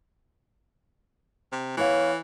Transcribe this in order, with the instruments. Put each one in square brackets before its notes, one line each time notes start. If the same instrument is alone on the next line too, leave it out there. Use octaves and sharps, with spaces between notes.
[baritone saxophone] C3
[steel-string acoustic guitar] E2 C#5 F5 [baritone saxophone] E3